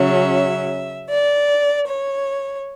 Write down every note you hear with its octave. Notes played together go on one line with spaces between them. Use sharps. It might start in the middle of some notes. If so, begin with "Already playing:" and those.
Already playing: C#3 F#3 C#4 E5
D5
C#5